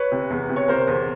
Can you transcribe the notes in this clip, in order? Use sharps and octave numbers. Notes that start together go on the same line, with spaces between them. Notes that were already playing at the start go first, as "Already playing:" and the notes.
Already playing: B4 C#5
C3
E2
C3
C#5
C3 A#4 C5
E2